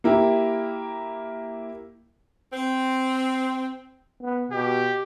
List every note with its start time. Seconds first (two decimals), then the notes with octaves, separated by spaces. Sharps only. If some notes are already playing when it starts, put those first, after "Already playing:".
0.04 A#3 E4 G4
2.53 C4
4.22 B3
4.52 B2 G4